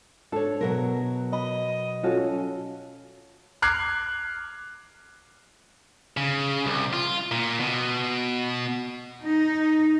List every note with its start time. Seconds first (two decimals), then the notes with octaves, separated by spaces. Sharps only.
0.32 D4 A4 C#5
0.61 B2 F#3 A#4
1.33 D#5 B5
2.03 C#4 F4 F#4 A4
3.62 D6 F6 F#6 G#6 C7
6.17 C#3
6.66 C2
6.93 F4
7.32 A#2
7.60 B2
9.24 D#4